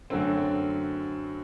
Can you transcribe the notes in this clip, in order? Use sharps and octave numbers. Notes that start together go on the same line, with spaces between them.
F#2 D3 F#3 A3 C4